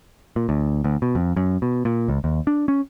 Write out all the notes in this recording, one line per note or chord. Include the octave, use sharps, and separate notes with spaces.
A#2
D2
D2
B2
F2
F#2
B2
A#2
C#2
D#2
D4
C#4